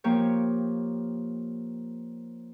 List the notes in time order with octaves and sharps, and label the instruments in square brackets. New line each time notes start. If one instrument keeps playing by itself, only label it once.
[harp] F3 A#3 G4 C#5